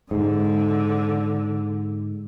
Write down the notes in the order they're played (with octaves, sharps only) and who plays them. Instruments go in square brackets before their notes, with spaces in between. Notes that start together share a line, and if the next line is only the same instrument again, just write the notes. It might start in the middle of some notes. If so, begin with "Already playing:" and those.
[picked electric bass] G#2 [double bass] D3